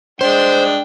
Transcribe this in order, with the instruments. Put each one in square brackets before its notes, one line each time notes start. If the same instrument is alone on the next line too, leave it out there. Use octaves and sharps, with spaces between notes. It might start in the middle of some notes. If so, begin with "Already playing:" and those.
[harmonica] G#3 D4 G5 [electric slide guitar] C5